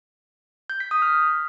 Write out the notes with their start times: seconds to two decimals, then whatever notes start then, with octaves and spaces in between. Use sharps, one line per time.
0.70 G6
0.80 B6
0.91 D#6
1.02 F6